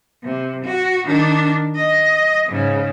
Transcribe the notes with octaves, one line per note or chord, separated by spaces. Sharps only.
C3
F#4
D#3 D4
D#5
G#2 C#3